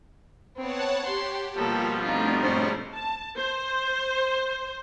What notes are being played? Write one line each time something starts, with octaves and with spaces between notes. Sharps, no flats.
B3 C4 C#5 F#5 A5
G4 C6
B2 F3 G3 A#3 F4 A4
A3 C4 D4 D#4 F4
G#2 A3 C5 C#5 C#6
A5
C5